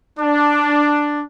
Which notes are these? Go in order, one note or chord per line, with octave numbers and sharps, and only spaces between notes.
D4